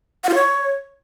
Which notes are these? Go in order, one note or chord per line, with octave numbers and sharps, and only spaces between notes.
F#5
F4
C#5